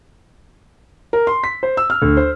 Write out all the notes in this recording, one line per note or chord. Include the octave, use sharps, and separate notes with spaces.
A#4
C6
B6
C5
E6
F6
D2
C5